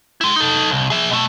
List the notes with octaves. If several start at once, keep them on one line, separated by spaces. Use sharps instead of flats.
G#3 E4
D#4 A4
C2
G#4 E5
B2 A3